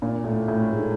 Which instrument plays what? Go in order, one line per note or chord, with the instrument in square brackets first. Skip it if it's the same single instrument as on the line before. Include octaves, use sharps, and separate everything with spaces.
[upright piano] A#2
A2
A2
G#2